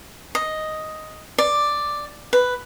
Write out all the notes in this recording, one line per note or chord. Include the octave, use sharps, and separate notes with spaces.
D#5
D5
B4